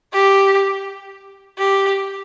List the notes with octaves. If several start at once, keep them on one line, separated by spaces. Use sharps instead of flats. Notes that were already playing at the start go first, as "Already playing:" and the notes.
G4
G4